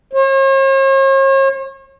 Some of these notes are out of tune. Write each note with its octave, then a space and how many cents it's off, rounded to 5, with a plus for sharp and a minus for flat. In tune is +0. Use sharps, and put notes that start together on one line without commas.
C#5 -45